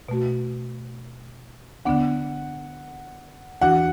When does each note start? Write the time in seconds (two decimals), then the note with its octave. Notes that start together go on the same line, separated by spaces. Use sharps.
0.09 B2 A3 F#4
1.85 D3 B3 D4 F#5
3.62 E2 E3 D4 F#4 F#5